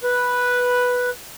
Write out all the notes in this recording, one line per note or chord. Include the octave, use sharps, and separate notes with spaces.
B4